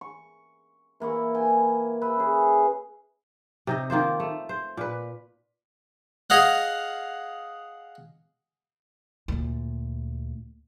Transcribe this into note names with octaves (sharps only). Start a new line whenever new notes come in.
C#6
E3 A#3 E4 C#6
G5 G#5
B4 E5
C#4 G#4
C3 D#4 D#5
D#3 A#3 F4 C5
A3
C5
A#2 B4
G#4 D#5 F5 F#5
D2 A#2